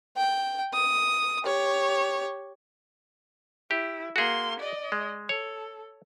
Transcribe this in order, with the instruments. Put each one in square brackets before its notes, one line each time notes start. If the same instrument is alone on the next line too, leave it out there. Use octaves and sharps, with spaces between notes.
[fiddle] G5
D#6
G4 C#5
[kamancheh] E4 [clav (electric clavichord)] G4
[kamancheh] A#3 C6 [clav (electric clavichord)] F#4 G#4
[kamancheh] D5 D#5
[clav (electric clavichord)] G#3
[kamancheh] A4 [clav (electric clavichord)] C#5